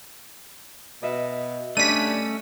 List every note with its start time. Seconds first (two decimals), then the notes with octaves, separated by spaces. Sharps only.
1.03 B2 D#5 E5
1.77 G2 A3 C#4 D4 B6 D#7